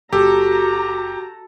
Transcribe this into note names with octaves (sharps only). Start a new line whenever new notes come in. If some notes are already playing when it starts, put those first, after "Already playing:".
F#1 F#4 G4 A4 A#5